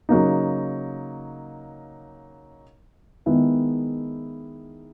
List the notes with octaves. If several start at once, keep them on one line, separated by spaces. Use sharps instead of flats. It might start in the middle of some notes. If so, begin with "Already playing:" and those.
C#3 F#3 A#3 D#4
D#3 G#3 B3 E4 G#4